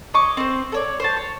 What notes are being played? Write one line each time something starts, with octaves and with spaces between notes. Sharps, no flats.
C#5 D#5 C#6 D6
C4 C5
A4 C#5 D5
C5 C#5 A5
C#5